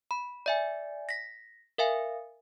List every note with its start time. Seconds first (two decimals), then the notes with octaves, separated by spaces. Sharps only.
0.11 B5
0.46 D5 E5 G#5
1.09 A#6 B6
1.78 A#4 E5 F5 G#5